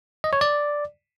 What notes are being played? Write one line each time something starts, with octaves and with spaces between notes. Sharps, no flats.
D#5
C#5
D5